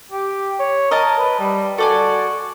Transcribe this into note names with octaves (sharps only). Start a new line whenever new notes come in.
G4
C#5
A#4 D#5 A5
B4
G3
F#4 A4 D5 G#5